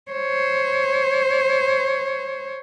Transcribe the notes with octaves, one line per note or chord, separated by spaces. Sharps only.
C5 C#5